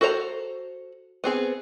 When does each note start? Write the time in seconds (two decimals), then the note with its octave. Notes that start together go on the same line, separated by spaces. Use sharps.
0.01 F#4 A4 C5 E5 A#5
1.24 B3 C4 G#4